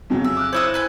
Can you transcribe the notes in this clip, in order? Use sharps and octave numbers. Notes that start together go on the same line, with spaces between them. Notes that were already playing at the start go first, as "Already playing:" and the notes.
F2 C#3 F#3
E5
D6 F6 F#6
E4 C5 C#5 E5 D#6
G#4 B4 G5